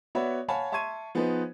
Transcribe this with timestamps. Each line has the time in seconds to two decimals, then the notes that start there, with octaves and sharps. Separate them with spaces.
0.15 B3 F#4 C#5 D5 E5 B5
0.48 C#5 F5 F#5 G#5 A5 B5
0.72 E5 A5 C6 C#6 G#6 D#7
1.15 F3 B3 D#4 G#4 B4 C5